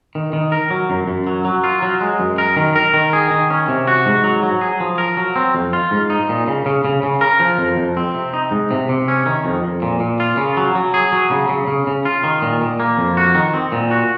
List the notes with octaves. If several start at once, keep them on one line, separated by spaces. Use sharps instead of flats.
D#3
D#3
A#4
F#3
F#2
F#2
F#3
F#3
F4
F#3
G#3
F#2
A#4
D#3
A#4
D#3
G#4
D#3
C#4
C3
F#4
G#2
F#3
F#3
G#4
F3
A#4
F#3
C4
F2
F4
G#2
D#4
A#2
C#3
C#3
C#3
C#3
A#4
F3
F2
F2
C4
C3
D#4
G#2
C3
C3
C#4
D#3
F2
F2
A#2
A#2
F4
C#3
F#3
F#3
G#4
F#3
C#3
C#3
C#3
C#3
F4
D#3
A#2
A#2
A#3
F2
F#4
D#3
C4
A#2
F#4